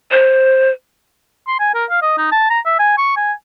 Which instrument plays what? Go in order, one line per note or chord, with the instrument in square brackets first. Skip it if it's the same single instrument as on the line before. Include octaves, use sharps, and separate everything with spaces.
[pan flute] C5
[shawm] C6
G#5
A#4
F5
D#5
D#4
A5
A#5
E5
G#5
C#6
G#5